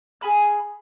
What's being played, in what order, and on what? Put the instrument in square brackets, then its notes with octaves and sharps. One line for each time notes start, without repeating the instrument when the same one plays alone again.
[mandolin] G#4 G#5 B5 F6